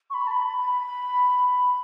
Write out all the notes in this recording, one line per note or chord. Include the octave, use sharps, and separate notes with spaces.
C#6
B5
A5
B5